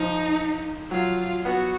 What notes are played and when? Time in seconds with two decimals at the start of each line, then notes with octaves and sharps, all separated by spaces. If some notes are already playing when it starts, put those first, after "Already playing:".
Already playing: F3 D#4
0.91 F#3 F4
1.45 B3 F#4